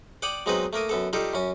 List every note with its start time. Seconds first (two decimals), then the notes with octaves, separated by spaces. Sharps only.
0.22 D5 F#5 G5 D#6
0.46 F#3 G#3 B3 C4 D#4 B4
0.73 A3 A#3 A#4 D#6
0.89 F#2 B3 A4
1.13 G3 D#4 F4 G4 A4
1.34 F#2 C#4